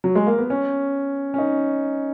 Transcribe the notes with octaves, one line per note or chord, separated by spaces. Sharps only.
F#3
G#3
A#3
B3
C#4
C#4
D#4